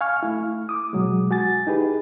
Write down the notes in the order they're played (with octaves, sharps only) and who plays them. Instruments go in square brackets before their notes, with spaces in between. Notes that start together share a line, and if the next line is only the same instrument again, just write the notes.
[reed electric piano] F5 G#5 C#6 F6
A3 E4
D6 D#6
B2 F#3 G#3
F#4 G#5 A6
D#4 E4 G4 G#4 B4